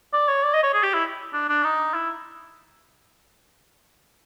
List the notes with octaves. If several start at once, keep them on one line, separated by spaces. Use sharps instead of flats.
D5
C#5
D5
D#5
C#5
G#4
G4
E4
D4
D4
D#4
E4